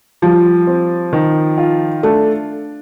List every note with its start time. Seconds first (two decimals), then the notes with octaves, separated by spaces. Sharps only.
0.22 F3 G3
0.67 C4
1.13 D#3
1.58 F4
2.03 A3 D4